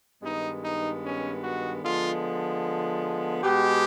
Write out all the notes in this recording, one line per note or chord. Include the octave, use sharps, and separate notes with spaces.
G2 D#3 G#3 B3 D#4
D#4
C#4
F#4
D3 F3 G#3 B3 F4
B2 G#3 B3 G4